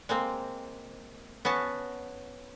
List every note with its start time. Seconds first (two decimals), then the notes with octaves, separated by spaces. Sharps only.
0.09 G#3 A#3 C4
1.45 B3 C#4 F#4 A5